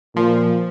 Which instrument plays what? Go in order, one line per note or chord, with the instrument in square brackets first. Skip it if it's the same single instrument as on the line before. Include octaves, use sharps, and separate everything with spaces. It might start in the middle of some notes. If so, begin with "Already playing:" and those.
[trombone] A#2 [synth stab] F3